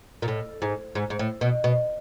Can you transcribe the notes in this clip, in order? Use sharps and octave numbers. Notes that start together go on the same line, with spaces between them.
A#2
A2
G#2
G#2
G#2
A2
B2
B2